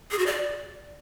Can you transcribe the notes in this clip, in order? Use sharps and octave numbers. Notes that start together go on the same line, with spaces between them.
G#4
F#4
D5